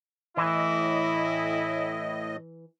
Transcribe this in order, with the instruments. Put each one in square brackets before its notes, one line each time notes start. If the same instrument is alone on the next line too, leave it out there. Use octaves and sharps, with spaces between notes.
[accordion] A2 D#5 [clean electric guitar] E3 [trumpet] E4